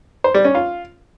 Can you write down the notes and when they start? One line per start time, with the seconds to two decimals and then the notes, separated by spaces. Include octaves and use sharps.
0.24 C5
0.34 G3
0.45 C#4
0.55 F4